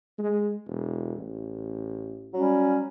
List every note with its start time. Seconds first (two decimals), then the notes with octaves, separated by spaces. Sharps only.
0.19 G#3
0.67 E1
1.19 A1
2.34 F#3 G3 C#4